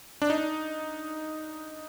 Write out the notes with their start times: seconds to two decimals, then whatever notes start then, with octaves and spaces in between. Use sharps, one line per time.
0.22 D4
0.30 D#4